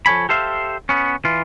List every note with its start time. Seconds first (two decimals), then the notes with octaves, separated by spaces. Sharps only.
0.06 F3 A4 C#5 G#5 B5
0.29 G4 A4 C5 E5 F5
0.89 B3 C#4
1.25 E3 F4